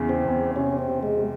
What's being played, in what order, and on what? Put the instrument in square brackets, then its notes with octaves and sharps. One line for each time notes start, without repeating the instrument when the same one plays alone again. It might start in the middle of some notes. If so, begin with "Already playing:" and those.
Already playing: [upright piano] E2 C#3 E3
[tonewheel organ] C4
[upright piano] E2
[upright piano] C3 [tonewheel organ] C#4
[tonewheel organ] C4
[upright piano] C3
[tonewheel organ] G#3
[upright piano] C3